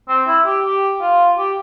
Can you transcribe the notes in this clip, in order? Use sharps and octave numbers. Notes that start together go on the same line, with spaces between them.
C4
E4
G4
G4
F4
G4